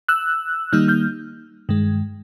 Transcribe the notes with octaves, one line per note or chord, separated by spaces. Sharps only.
E6 F#6
D#3 G3 A#3 D#4 F6 G6
F6 G6
G2 D#3 G#3